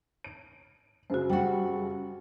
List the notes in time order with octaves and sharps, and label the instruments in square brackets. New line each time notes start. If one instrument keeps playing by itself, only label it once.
[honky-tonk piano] D7
[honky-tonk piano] F#2 C#3 [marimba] F#4 C5
[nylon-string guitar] G3 F#4 [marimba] G5